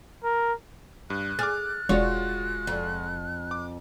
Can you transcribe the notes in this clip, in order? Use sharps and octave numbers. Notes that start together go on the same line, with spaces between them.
A#4
G2 F#6
G#4 D6 F6 A6
E1 G#3 F4 F#4 C#5
F2
D6